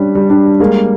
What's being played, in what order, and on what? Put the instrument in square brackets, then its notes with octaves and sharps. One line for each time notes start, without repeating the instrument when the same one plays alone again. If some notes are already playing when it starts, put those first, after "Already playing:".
Already playing: [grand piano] G3 [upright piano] C#4 D4
[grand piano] G3
[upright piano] D4
[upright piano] G#3 [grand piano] A#3